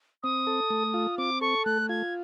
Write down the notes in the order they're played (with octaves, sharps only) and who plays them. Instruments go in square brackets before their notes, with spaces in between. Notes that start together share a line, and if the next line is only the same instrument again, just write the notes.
[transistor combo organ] C4 [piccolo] D#6
[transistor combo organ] A4
A3
F4
[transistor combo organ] C4 [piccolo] D6
[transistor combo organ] A4 [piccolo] C#6
[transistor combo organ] A3 [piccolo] F#6
[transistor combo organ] F4 [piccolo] G#6